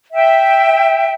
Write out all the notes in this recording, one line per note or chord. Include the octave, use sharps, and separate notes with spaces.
E5 G5